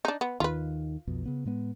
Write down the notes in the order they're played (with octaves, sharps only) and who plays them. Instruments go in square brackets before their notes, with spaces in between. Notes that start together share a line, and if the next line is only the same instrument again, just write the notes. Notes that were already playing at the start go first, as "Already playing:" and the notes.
[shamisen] D4 D#4
B3
[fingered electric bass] D#2 D#3 [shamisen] F4 B4
[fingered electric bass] B1 F2 B2
C#3 B3
A2 G#3 B3